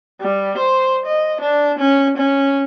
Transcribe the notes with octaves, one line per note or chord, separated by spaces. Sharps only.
G3
C5
D#5
D4
C#4
C#4